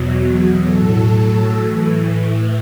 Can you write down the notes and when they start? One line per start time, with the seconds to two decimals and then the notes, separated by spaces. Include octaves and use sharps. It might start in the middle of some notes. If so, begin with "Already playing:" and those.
Already playing: E2 B2 F#3
0.63 A2 F#3 A4
1.56 A2 E3